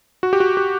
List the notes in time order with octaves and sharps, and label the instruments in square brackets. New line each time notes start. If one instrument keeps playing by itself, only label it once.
[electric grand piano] F#4
G4
F#4
G4